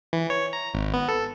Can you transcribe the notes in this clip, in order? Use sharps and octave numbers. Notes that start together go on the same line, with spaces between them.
E3
C#5
A#5
G#1
B3
A4